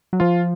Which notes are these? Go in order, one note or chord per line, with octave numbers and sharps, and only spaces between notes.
F#3
F3 F4